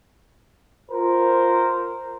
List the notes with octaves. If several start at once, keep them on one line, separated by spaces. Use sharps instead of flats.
F4 A#4 C5